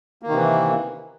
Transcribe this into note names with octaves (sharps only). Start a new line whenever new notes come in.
C3 D#3 E3 A#3